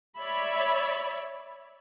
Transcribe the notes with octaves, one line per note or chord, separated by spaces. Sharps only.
C#5 D5 E5 B5